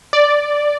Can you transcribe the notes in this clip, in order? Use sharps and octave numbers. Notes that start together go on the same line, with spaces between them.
D5